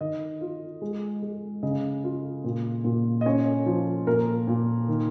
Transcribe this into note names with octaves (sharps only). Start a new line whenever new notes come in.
D#3 D#5
F4
G#3
G#3
C#3 D#5
F4
A#2
A#2
D#5
C#4 C#5
F3
A#2 A#4
A#2
D#3